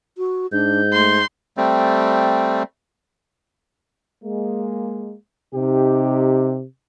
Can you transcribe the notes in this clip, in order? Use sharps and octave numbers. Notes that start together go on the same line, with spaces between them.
F#4
G#2 D4 G6
A3 C6
G3 A3 C4
G#3 A#3
C3 D#4 G4